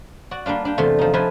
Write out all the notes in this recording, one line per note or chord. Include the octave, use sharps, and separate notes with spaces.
F#4 D5
G3 A#3 D4 F4
D4 G4
E2 C3 A3 F4
F3 D#4
F3 A3 F4 B4 G#5